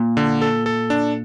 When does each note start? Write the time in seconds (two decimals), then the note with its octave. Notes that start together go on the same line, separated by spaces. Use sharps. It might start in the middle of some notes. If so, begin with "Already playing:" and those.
Already playing: A#2
0.17 D3
0.42 A4
0.66 A4
0.90 D4